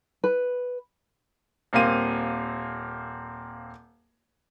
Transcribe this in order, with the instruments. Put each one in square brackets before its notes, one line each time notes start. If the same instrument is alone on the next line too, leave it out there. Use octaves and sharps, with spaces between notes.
[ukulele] B4
[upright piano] D#1 A#3 C4 F5 D#7